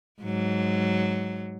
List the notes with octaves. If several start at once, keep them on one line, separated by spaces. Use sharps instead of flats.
G#2 F#3